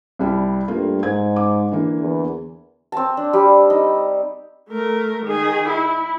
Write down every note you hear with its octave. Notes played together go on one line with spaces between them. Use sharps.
C2 G3 E4
G2 A3 A#3 F4
G#2 G#6
D6
D3 E3 A#3
E2
C4 A5
D4
G3
D#4
A3 A#4
D#3 G#4
E4